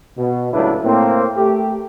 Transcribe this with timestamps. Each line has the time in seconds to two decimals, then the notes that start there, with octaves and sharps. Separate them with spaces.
0.18 B2
0.53 C#2 A2 F#3 D4 E4 B4
0.84 A2 A#3 C4
1.36 A3 G4